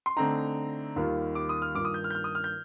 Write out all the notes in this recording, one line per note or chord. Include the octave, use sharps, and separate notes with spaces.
C6
D3 A3 C4 D#4 A#5
D#2 D#3 G3 A#3 F4
D6
D#6
F6
G2 D#3 A#3 F4 D6
D#6
G6
F6
G6
F6
D#6
F6
G6